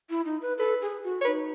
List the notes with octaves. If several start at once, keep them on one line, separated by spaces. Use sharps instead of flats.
E4
D#4
B4
A4 B4
G#4
F#4
C#5
D#4 B4